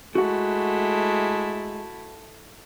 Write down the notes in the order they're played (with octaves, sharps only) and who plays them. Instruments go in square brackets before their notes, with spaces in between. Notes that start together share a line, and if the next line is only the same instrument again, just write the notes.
[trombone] G#3 [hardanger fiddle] A3 E4 [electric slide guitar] F#4 F#5